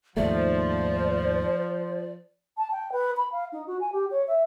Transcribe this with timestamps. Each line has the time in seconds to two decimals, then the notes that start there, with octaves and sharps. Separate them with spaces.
0.17 D#2 G#2 F3 A3 C5 D5
2.57 A5
2.71 G5
2.92 B4
3.17 B5
3.32 F5
3.53 D#4
3.67 F#4
3.80 G#5
3.92 G4
4.11 C#5
4.28 E5